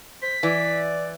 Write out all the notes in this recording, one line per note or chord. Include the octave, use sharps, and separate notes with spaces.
C5 B6
E3 D5